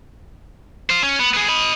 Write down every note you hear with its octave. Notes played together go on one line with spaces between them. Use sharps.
C5 F5
C#4
B3
B3 G#4
D#5 B5